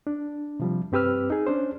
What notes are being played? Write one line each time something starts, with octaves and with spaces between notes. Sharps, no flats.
D4
C3 F3 G3
G2 C4 G4 B4 E6 F6
D#4 G#4
C#4 D4 C5